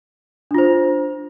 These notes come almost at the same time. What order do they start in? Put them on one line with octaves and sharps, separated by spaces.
D4 F4 C5